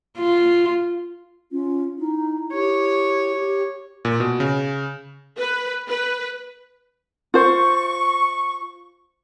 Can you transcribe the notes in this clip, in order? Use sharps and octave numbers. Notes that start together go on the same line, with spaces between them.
F4
C#4 F4
D#4 E4
G4 C#5
G4
A#2
B2
C#3
B4
B4
F4 C5 C#6